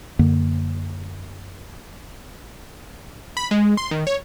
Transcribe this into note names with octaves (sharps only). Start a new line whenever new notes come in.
F#2 D3 A#3
B5
G#3
C6
D#3
C#5